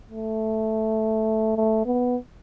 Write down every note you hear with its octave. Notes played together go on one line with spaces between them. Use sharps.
A3
A3
B3